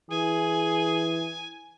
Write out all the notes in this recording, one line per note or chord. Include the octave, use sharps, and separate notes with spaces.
E3 G#4 G#5